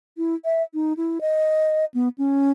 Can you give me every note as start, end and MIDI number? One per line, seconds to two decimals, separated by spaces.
0.17 0.35 64
0.45 0.63 76
0.74 0.93 63
0.97 1.19 64
1.21 1.85 75
1.94 2.09 59
2.18 2.52 61